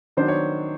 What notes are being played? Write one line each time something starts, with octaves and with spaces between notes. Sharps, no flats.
D#3 F#3 B3 D4 C5
C#5